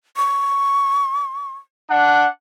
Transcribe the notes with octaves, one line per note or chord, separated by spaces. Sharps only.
C#6
D4 F#5